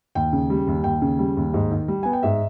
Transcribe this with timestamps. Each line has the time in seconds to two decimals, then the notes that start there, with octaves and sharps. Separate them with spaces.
0.15 D#2 G5
0.33 C#3
0.50 G3
0.67 D#2
0.84 D#2 G5
1.02 C#3
1.19 G3
1.37 D#2
1.54 G#2
1.71 D#3
1.88 G3
2.03 B3 G#5
2.13 G5
2.23 G#2 E5